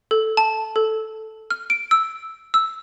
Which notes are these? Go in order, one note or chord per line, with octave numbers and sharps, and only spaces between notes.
A4
A5
A4
F6
D7
E6
E6